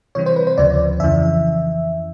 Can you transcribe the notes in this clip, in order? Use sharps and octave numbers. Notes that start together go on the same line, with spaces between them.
C3 E3 G3 C4 C#5
C5
B4
C5
D2 C#3 F3 D5
F2 C#3 E3 E5